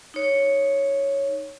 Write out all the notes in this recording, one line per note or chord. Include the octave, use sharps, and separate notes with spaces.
D#4 C#5